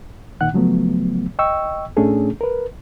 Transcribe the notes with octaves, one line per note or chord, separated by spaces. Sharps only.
A#2 D#3 F#5 F#6
C#3 F3 F#3 A3 B3
D#5 G5 C#6 E6
A2 A3 C#4 D4 G#4 A4
A#4 B4